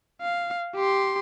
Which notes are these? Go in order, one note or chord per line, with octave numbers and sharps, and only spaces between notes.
F5
G4 C6